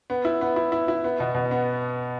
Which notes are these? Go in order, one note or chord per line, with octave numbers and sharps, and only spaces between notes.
B3
E4
B3
E4
E4
E4
B3
B2
B2
B3